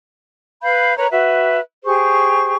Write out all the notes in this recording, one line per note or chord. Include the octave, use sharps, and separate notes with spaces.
B4 F5 B5 G6
A#4 B4 C#5 A#5
F#4 B4 E5
G4 G#4 C5 C#6